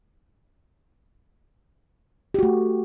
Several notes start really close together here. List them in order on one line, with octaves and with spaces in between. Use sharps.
G4 F#4 A3